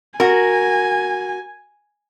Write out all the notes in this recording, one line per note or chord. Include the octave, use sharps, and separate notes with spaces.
F#4 A#4 G#5